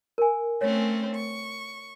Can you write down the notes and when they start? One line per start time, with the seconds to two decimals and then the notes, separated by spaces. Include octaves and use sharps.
0.18 A#4 G#5
0.61 A3 C4 C#4 C#5
1.15 C#6